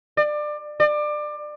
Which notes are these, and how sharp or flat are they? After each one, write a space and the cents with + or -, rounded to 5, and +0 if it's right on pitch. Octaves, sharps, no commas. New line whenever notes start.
D5 +25
D5 +25